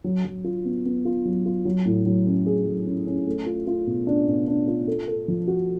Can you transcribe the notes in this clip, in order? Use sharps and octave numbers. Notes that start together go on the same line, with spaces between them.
F#3
F#3
F4
B3
B3
F4
F#3
F4
F#3
A2
F#3
C#4
G#4
F#3
C#4
C#4
A3
F4
F4
B2
D4
B2
D4
F4
A4
A4
F3
F#4